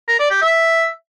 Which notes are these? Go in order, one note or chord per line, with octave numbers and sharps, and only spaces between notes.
A#4
D5
G4
E5